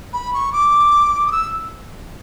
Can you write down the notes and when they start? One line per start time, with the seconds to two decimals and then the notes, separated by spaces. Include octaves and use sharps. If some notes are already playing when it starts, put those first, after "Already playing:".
0.13 B5
0.33 C#6
0.52 D6
1.26 D#6
1.32 E6